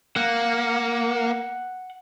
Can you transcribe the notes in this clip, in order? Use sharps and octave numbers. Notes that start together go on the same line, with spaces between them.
A#3 F#5